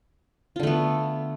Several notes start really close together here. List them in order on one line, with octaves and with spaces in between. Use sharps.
F4 D3 A3 B3